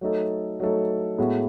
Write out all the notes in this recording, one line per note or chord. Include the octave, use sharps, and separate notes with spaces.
F#3 A3 D#4 A4
F#3 A3 D#4 A4
A2 G#3 B3 F#4